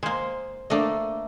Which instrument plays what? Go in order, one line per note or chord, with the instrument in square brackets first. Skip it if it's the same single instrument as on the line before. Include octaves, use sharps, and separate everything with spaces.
[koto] G#3 A#3 [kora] C5
[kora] A3 A#3 [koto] D4 D#5